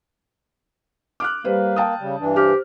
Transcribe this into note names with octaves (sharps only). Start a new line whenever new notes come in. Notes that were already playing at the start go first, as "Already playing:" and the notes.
D6 F6 F#6
G3 A#3 B4 C5
G5 A5 D#6
C#3 G3
G2 E3 D4
G4 C5 F6